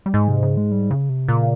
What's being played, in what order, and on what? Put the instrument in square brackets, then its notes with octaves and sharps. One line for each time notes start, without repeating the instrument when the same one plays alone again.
[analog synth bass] G3
[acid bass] G#2 [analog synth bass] G#3
[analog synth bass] C3
C#3
G#3
G3
C#3
C3
[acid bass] A#2 [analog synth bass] C#3